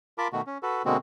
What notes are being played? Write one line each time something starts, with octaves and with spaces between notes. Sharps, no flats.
F4 A#4 A5 B5 D6
B2 D#3 A3 F#4
C#4
F#4 A4 B4
B2 D3 G#3 A#3 C4 F#4